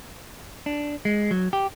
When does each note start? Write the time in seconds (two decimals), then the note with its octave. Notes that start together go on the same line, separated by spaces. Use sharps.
0.66 D4
1.05 G#3
1.31 F#3
1.53 G4